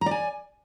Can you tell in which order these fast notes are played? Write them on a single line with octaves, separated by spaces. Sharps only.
A#5 D5 G#5